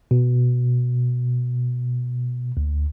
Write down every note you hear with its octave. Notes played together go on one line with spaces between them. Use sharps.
B2
D2